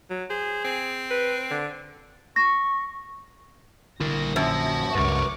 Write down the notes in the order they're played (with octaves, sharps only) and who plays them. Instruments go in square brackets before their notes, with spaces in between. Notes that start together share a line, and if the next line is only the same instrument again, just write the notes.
[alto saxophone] F#3
[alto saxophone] G#4 [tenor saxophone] C5
[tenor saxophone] C4
[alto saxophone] B4
D3
[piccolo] C#6 [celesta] A#6
[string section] A#1 A#6 [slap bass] D3 [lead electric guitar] E4 A#4
[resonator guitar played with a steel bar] F#2 [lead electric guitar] C5 A5
[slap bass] C#2 G2 [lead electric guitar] A#4 B4 [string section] C#6 D6